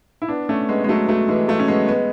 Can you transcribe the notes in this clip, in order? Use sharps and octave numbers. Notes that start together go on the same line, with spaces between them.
E4
B3 D4
A3 C#4
G#3 B3
G#3
F#3 A3
F#3 A3
E3 G#3
F#3 A3
C#4
G#3 B3
G#3 B3